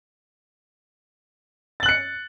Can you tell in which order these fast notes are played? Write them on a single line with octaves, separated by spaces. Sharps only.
A6 F#7 F#6 C#7